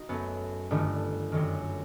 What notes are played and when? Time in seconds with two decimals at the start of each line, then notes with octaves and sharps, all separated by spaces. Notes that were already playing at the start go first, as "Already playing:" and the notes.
Already playing: D#4 F#4
0.09 F#2 F#3 A3 B3
0.71 G1 G2 D#3 A3
1.32 G1 F#2 D#3